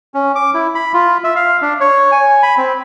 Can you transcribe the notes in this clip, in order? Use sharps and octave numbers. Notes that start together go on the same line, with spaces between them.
C#4
D6
E4
B5
F4
E5
F5
D4
C#5
G#5
B5
C4